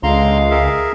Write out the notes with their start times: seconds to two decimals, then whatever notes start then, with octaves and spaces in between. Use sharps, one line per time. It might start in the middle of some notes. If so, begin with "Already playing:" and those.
0.03 C#2 D3 G#3 F5 A#5 C6
0.51 G#4 A#4 E5